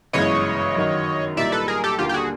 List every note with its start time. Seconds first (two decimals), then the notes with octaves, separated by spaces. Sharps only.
0.13 G1 F#2 C#3 E3 G#3 C#5 D#5
0.75 F#2 D#3 F#3
1.37 C2 A#2 G3 A#3 D#4 D5 E5
1.52 A4 B4
1.68 G#4 A#4
1.84 G4 A4
1.99 D#2 D3 G3 A#3 F4 G4
2.09 G4
2.14 F#4 G#4